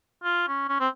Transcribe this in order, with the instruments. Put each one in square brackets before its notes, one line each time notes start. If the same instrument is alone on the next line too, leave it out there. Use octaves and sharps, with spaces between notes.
[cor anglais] F4
C#4
C#4
C4